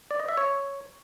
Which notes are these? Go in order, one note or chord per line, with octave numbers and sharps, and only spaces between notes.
D5
D#5
E5
C#5